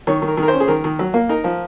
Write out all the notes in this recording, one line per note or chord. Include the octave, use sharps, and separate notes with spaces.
D#3 C#5
D#3
A#4
D#3
A#4
C5
C#4
G#4
D#3 A#4
D#3
F#3
A#3
D#4 A#4
F3